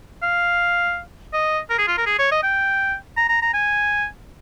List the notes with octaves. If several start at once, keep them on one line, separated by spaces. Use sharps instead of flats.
F5
D#5
A#4
G#4
F4
A#4
G#4
C#5
D#5
G5
A#5
A#5
A#5
G#5